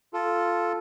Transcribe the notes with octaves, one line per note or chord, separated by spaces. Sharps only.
F4 A4